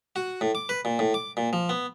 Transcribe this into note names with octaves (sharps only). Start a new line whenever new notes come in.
F#4
A2
D6
B4
A#2
A2
D6
A#2
F3
B3